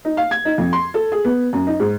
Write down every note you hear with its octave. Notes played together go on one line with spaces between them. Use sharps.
D#4
F5
G#6
D#4
F2
C6
A4
G#4
B3
F#2
D#4
G#2